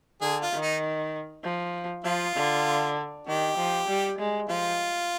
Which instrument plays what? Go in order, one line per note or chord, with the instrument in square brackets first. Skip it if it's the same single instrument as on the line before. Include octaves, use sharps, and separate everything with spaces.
[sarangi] D3 [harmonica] G#4
[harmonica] F4
[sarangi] D#3
[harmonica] D#4
[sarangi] F3
[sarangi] F3 [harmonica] F4
[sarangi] D3
[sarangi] D#3 [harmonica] G4
[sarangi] F3
G3
G#3
[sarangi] F3 [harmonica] F4